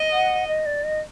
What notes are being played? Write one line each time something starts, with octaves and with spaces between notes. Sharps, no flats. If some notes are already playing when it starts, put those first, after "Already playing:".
Already playing: D#5
F#5
D#5
D5
D#5